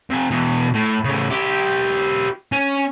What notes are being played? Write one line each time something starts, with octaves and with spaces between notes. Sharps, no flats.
C3 G#5
B2 E3
A2
A2 C#3
E4 G4
C#4